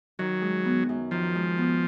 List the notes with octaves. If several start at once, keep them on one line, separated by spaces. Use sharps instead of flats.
D#3 F#3
G#3
B3
F#2
D#3 F3
G#3
B3